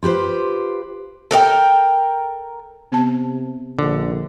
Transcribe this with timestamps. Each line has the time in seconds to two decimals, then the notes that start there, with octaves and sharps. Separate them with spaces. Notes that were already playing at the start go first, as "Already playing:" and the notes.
0.03 F4 G4 B4 C5
1.31 A4 A#4 D#5 G5
2.92 C3 B3 A5
3.79 A#1 D3